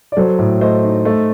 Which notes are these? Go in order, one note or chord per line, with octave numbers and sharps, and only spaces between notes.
D5
F#3 A4 C5
A2
A3 C5 D#5
D#4
A3